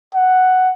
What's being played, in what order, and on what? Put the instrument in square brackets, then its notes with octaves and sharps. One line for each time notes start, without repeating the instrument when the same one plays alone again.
[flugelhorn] F#5